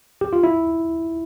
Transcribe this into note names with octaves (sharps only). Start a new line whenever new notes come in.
G4
F4
E4